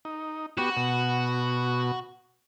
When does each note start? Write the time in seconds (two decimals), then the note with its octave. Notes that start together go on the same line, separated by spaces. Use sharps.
0.05 D#4
0.58 B3 F#4 G4
0.77 B2